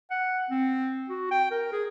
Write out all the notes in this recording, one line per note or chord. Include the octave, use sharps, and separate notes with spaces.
F#5
C4
F#4
G5
A#4
G#4